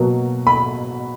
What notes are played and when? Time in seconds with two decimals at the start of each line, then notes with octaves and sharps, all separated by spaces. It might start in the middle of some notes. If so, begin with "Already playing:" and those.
Already playing: B2 F#3 A#3
0.47 B5